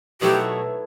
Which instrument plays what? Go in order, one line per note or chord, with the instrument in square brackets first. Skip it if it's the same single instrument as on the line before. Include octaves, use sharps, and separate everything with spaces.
[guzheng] B2 F#3 A3 E4 [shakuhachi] G4